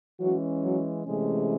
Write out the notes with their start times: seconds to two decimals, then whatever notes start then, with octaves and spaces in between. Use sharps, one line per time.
0.20 E3 F#3 G#3 C#4 F#4
0.64 F#3 F#4
1.06 C3 E3 G#3 A3 C#4 G#4